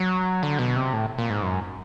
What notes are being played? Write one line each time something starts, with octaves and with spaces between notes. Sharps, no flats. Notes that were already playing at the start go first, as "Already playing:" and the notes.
Already playing: F#3
D3
B2
C3
A2
A#2
G#2
F#2